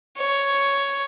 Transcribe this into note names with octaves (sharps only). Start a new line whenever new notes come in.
C#5